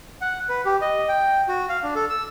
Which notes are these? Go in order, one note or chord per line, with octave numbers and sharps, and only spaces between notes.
F#5
B4
G4
D#5
G5
F#4
F5
D4
A4
E6